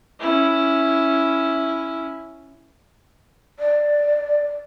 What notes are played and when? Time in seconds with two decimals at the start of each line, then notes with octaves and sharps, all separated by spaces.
0.20 C#4 E4
3.59 D5